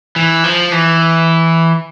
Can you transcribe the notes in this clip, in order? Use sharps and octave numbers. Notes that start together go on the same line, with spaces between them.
E3
F3
E3